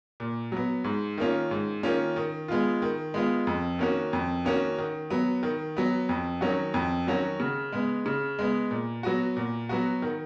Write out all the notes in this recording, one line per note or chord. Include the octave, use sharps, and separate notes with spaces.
A#2
F#3 B3
G#2
D#3 A#3 C#4 F4
G#2
D#3 A#3 C#4 F4
D#3
G#3 B3 F4
D#3
G#3 B3 F4
F2
D#3 A#3 C#4 F#4
F2
D#3 A#3 C#4 F#4
D#3
F#3 B3
D#3
F#3 B3
F2
D#3 F#3 C#4 F#4
F2
D#3 F#3 C#4 F#4
C#3
G#3 B3
C#3
G#3 B3
A#2
F#3 B3 F#4
A#2
F#3 B3 F#4
D#3